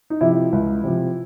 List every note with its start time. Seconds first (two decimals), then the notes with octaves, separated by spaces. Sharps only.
0.10 D#4
0.21 C3 F3 E4
0.52 C#2
0.84 C3 F3